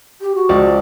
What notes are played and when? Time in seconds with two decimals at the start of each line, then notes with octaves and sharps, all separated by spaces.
0.21 G4
0.35 F#4
0.49 C#2 F3 D5